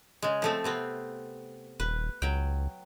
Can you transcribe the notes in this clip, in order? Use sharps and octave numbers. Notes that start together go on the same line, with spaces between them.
C#3 G#3
F3 A3 C4
C3 B3 C4
D#1 B4
C#2 F#3 G5